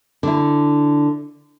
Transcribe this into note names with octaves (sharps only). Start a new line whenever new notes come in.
D3 E4